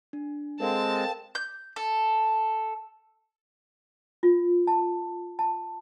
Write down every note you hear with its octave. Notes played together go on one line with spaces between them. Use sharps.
D4
G#3 C4 A4 A#4 C5 F5 G5 A5
G6
A4
F4
A5
A5